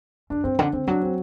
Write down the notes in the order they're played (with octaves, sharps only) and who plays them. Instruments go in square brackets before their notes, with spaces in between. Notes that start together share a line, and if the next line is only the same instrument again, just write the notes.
[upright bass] F#2 [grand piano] D4
[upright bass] G2 [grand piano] C4
[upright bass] D3 [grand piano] D4
[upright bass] D3 [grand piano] C4
[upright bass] F#3 [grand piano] D4
[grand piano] C4